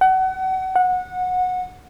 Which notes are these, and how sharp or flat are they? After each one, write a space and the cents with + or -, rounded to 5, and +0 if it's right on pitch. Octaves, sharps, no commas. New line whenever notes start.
F#5 +30
F#5 -20